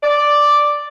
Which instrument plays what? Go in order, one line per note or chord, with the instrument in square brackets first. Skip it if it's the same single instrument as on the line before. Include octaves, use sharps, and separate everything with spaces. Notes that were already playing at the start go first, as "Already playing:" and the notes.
[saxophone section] D5